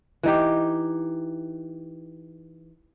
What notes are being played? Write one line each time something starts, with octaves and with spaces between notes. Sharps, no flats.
E3 D#4 G4